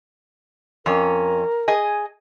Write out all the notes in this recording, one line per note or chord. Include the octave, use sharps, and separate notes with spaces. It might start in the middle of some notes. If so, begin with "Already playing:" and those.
F2 C#4 A#4
G#4 D#5 G#5